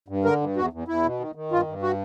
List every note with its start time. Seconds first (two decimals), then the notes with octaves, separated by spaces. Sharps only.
0.08 G2
0.25 D3 A#4
0.41 G2
0.56 E2 F#4
0.73 E2
0.88 E2 E4
1.04 B2
1.20 D#3
1.35 D#3
1.52 G2 F4
1.67 G2
1.82 F#4